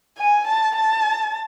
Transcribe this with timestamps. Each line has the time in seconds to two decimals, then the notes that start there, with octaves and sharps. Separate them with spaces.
0.17 G#5
0.46 A5
0.75 A5